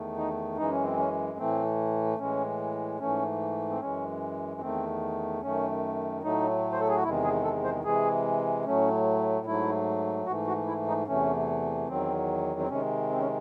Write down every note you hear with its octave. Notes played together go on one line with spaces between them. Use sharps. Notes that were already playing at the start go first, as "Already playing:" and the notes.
Already playing: E2 D#3 A3
D#4
F#2 E3 G#3 D#4
C#4
C4
C#4
A2 E3 A3 C4
A2 E3 G#3 C#4
G#2 E3 A3 C#4
C4
F#2 E3 G#3 C#4
E2 D#3 A3 C4
F#2 D#3 A3 C#4
A2 F#3 A3 D#4
C5
A4
G#4
F#4
E2 C3 D#3 G#3 E4
G#4
A4
C5
C3 E3 G#3 G#4
A2 F#3 A3 C#4
G#2 F#3 A3 E4
G#2 E3 A3 F#4
F#4
E4
D#4
E2 C3 E3 A3 C#4
E2 D#3 F#3 C4
C4
C3 D#3 G#3 C#4
C4
C#4